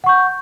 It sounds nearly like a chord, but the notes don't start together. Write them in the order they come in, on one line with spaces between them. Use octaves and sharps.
F#5 C#6 G6